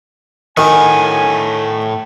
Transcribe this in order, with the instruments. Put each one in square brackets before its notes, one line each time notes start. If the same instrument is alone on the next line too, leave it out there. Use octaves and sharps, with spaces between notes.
[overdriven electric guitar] A2 F#4 [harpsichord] D#3 [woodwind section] G#5